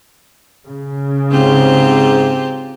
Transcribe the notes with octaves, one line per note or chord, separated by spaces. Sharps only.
C#3
G#2 C4 F4 G4